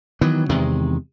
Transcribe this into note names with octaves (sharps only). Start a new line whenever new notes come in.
D#3 E3 F#3 B3
E2 C3 D#3 G#3